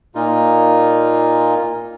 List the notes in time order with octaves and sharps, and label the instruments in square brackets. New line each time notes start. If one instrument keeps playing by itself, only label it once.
[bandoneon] A#2 A#3 D#4 F4